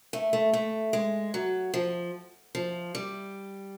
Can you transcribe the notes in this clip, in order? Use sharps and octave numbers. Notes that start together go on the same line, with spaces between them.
A3
A3
A3
G#3
F#3
F3
F3
G3